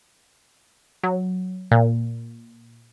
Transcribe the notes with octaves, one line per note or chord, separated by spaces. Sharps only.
F#3
A#2